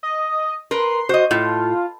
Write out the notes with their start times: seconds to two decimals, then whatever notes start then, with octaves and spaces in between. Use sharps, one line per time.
0.03 D#5
0.71 A#4 B4 C6
1.09 F#4 C5 D#5
1.31 A2 F4